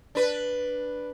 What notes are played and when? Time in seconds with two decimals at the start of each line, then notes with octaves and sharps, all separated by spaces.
0.15 D4 B4